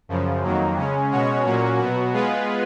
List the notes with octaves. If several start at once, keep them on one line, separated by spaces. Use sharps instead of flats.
F#2 C#3 F3
F2 D#3 F#3 A#3
C#3 G#3 C#4
B2 G#3 C#4 F#4 C#5
A#2 F#3 A#3 C#4 F#4
B2 F#3 B3 F#4
G#3 B3 F4 G#4 B4